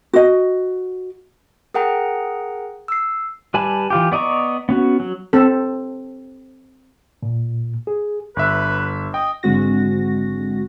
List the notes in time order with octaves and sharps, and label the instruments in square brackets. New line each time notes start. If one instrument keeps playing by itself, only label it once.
[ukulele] F#4 D#5
[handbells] G#4 A#4 F#5 G5 A#5
E6 C7
[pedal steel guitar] G3 B4 G#5 A5 B5
E3 F4 G4
B3 D5 D#5 A#5 C#6
B3 C#4 F#4
F#3
[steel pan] C4 A4
[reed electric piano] A#2
G#4
[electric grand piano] G1 E5 [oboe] B4
[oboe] D#5 [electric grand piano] G5
[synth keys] G#1 D3 G#3 C4 F#4 A#6